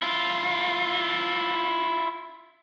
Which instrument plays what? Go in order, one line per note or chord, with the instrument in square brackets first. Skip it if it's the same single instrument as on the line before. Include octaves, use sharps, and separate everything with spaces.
[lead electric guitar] E4 F4